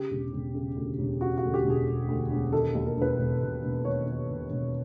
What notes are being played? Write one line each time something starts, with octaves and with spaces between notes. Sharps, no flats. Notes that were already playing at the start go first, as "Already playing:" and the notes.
Already playing: C#3 G4
E1
E1
C#3
D2
E1
C#3 F#4
D2 F#4
G4
E1
G#4
E1
D2
E1
D#3 A4
D#2
A#4
E1 B4
E1
E1
E1
D#3 C#5
D#3
E1
E1